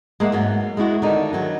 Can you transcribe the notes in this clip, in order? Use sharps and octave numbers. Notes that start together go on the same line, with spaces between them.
G#3 A#3 E5 F#5
G#2 F#3 B3
G#3 B3 E4 F#4
D3 D#3 D#4
D#3 F#3 B3